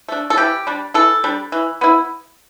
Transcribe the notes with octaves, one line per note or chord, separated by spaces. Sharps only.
A3 D4
A4
E3 G4
G3 D4
E3 A4
G3 D4
E3
B3 E4